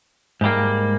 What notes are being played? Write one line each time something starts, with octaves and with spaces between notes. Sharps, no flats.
G#2 G3 A#3